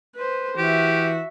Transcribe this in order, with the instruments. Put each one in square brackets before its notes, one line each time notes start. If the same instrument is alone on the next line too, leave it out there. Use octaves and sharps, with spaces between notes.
[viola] B4 C5
[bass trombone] E3 [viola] F#4 E5 [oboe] G4